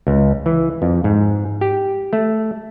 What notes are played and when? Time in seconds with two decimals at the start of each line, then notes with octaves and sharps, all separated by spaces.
0.07 C#2
0.46 E3
0.82 F2
1.04 G#2
1.61 G4
2.13 A3